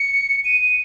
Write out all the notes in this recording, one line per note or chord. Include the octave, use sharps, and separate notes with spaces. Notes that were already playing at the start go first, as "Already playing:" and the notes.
Already playing: C#7
D#7
D#7